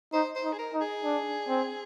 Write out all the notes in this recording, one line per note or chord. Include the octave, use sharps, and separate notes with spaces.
D#4 C5
C5
D#4
G#4
A#4
D#4
G#4
D4
C4